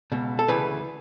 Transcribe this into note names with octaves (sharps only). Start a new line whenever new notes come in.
C#2 B2
A4
D2 C#3 E3 B4